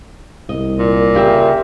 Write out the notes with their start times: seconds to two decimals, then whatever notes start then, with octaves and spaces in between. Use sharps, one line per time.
0.49 C2 D#5
0.79 A#2
1.15 C#3 G4 E5